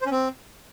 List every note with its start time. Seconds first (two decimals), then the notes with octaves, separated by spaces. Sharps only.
0.01 C5
0.06 C#4
0.11 C4